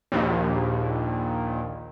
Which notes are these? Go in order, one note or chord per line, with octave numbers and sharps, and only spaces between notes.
A#1 D#2